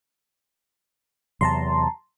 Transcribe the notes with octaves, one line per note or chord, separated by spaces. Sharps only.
E2 C3 F#3 A5 A#5 C6